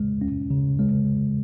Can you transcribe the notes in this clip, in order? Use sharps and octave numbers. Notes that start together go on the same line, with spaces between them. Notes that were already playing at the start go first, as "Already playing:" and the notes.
Already playing: G#3
C#4
C#3
G#3